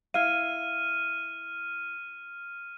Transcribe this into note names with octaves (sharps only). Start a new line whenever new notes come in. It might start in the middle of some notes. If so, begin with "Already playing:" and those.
E4 F5 F6 D#7